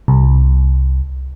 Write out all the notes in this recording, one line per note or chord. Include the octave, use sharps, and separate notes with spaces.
C2